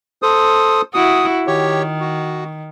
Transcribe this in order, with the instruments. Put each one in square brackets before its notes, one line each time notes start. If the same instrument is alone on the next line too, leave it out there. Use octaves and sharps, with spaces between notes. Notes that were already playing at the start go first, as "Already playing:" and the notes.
[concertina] A4 C5 D#6
[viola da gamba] E4 F#4 [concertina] D#6
[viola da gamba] D#3 [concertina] G4 C#5
[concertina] F#4